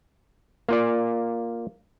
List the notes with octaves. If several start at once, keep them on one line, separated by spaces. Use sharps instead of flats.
A#3 F4 D5